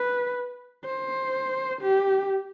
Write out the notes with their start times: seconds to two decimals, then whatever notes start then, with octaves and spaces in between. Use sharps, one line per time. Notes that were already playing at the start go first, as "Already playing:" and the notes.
Already playing: B4
0.85 C5
1.82 G4